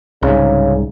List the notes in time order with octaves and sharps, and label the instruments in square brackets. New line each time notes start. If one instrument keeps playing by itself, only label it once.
[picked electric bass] C2 G#2 [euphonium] C#3